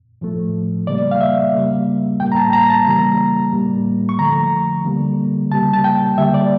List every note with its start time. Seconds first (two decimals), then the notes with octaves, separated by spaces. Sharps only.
0.21 A2 F3 A3
0.87 C#3 G3 A#3 D5
1.11 F5
1.21 E5
1.54 C#3 G3 A#3
2.20 A2 G3 A#3 G5
2.32 A#5
2.36 A5
2.53 A#5
2.70 A5
2.86 C#3 E3 G3 A#3 A#5
3.53 A2 G3 A#3
4.09 C#6
4.19 D3 F3 A3 A#5
4.85 D3 G3 A#3
5.51 C#3 G3 A#3 A5
5.73 A5
5.84 G5
6.17 D3 G3 A#3 E5
6.34 D5